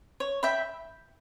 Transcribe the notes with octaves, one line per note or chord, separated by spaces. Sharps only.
C#5
E5 G5 B5